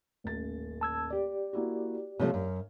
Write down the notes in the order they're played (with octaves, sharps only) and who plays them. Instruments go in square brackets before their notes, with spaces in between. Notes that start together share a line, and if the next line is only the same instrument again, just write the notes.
[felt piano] D#1 A1 A6
[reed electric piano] A5 E6 G#6
G4 D5
[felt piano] A#3 E4 F#4
[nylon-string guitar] C3 F3 A3 [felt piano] C#5 F5
[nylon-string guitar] F#2